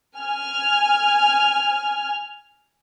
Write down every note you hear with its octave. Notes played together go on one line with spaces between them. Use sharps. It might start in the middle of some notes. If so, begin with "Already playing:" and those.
G#5 F6